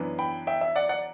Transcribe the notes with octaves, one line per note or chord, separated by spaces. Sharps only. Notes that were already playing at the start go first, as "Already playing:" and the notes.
Already playing: F#2 E3 B3 D4
G5 B5
E5 G5
E5
D5 F#5
D5 F#5